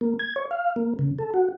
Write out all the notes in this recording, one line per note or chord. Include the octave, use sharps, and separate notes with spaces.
A#3
G#6
C#5
F5
A#3
C#3
A4
F#4